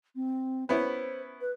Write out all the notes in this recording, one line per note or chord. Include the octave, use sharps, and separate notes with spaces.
C4
B3 C#4 E4 C5
B4